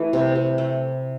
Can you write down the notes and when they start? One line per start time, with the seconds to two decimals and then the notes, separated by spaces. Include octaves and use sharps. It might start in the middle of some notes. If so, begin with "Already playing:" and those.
Already playing: E3 A3
0.13 C3
0.35 C3
0.58 A3